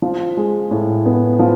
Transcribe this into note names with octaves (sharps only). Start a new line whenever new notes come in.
F3
G#3
A2
B3
F3